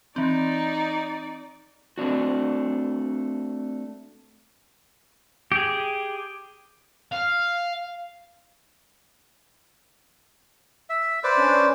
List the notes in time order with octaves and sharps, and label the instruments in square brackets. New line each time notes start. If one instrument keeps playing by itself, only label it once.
[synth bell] E3 C4 [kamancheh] D#4 D5
[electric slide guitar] A3 C4 D4 F#4
[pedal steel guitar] G4 G#4
[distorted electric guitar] F5
[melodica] E5
B4 C5 D5
[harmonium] C#4 D4